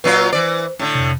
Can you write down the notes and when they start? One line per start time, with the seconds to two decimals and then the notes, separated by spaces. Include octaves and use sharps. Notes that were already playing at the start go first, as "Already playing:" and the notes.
0.04 A#2 F#3 F4 B4
0.32 E3 C5 D5
0.79 A2 D3
0.95 F2 C3